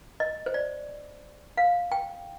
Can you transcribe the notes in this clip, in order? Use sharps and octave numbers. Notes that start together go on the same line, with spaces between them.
D#5
C5
D5
F5
G5